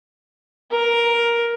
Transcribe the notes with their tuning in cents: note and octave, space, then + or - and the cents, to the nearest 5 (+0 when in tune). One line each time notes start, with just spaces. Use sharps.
A#4 +10